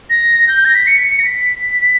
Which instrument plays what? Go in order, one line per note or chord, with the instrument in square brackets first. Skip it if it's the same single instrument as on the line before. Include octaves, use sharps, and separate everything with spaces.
[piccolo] A#6
G6
A#6
B6
C#7
A#6
B6